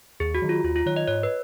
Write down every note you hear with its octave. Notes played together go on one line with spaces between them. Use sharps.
D#2 G#4
F#4
D#3 F#3
F4
D#2 F4
F4
D#3 F#3 C#5
D#5
G#2 C#5
B4